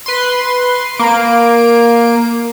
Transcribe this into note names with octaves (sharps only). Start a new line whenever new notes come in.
B4 C6
A#3 D7